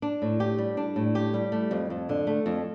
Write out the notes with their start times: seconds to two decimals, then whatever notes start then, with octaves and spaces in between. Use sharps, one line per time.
0.02 D4
0.22 A2
0.40 G4
0.58 G3
0.77 D4
0.96 A2
1.15 G4
1.34 G3
1.52 A3
1.71 F2
1.90 F2
2.09 D3
2.27 A3
2.46 F2